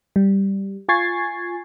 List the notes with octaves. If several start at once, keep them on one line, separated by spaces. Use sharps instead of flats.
G3
F4 G#5 C#6 G#6 A6 C7